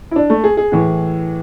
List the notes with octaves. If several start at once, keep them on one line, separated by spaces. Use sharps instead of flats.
E4
D4
A3
G#4
G#4
A2 E3